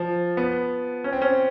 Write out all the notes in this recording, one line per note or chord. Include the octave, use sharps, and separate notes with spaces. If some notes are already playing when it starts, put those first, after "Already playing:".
Already playing: F3
B3
C#4
C4
C#4